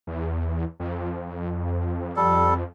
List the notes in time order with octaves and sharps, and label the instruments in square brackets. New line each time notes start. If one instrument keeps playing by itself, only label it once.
[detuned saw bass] E2
F2
[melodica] G3 A4